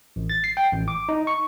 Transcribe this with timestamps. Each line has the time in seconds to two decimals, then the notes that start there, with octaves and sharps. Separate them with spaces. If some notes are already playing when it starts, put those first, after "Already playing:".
0.16 A1
0.30 A6
0.44 C7
0.57 G5
0.73 A1
0.88 D6
1.09 D#4
1.27 C#6